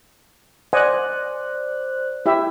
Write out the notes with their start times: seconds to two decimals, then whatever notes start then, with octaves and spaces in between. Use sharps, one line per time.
0.73 C5 D5 D#5 F#5 G#5 F#6
2.26 E4 G4 E5